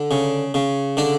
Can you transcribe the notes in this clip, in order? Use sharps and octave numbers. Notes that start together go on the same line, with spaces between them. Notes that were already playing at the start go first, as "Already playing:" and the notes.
Already playing: D3
C#3
C#3
D3 D4